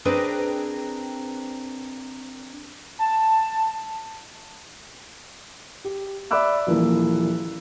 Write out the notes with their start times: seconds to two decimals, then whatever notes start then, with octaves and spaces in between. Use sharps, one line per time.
0.05 C4 D4 G#4 A#4 B4 G5
2.99 A5
5.84 G4
6.31 D5 E5 B5 D6 E6 F#6
6.67 D#1 E3 F3 A#3